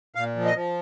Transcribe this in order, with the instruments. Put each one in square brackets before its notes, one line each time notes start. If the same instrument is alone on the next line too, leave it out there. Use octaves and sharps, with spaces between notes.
[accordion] A#2 F5
F3
D#5
F3